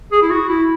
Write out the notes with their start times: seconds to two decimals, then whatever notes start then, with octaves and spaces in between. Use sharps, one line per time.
0.12 G#4
0.22 E4
0.30 F#4
0.49 E4